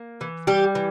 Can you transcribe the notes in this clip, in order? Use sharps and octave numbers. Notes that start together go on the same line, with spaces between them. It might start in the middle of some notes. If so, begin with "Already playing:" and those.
Already playing: A#3
E3
G3 G4
E3